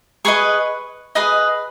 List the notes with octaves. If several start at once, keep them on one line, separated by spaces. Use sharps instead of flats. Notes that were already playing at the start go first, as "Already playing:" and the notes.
G#4 B4 D#5 C#6
G#4 B4 D#5 D#6